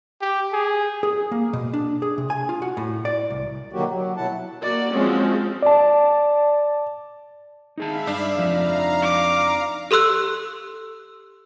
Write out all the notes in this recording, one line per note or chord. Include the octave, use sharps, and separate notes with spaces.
G4
G#4
G#4
A#3
B2
D4
G#4
C3
G#5
F4
F#4
A2
D5
C2
D3 D#3 F#3 A#3 F#4 G4
F#3
B2 F#3 E4 F#5 A5
A#3 F#4 D5
F3 F#3 G#3 C4 C#4 F#4
D5 A5
D#4 G#4 E5 F5 A5 B5
G2 D4
F2 F3 D#4 F5 A#5
D6
G4 A4 C6 E6 F#6